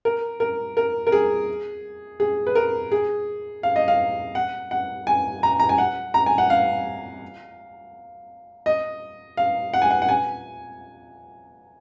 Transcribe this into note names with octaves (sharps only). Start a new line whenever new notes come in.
A#4
A#4
A#4
A#4
G#4
G#4
B4
A#4
G#4
F5
D#5
F5
F#5
F#5
G#5
A#5
A#5
G#5
F#5
A#5
G#5
F#5
F5
D#5
F5
F#5
G#5
F#5
F#5
G#5